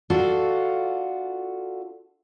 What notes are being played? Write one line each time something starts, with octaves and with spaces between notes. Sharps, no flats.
D4 F4 F#4 A4